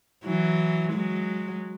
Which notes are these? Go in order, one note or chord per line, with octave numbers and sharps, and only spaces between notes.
E3 F#3
F#3 G#3